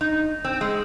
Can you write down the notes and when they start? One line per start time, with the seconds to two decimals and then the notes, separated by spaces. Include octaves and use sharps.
0.01 D#4
0.45 C4
0.61 G#3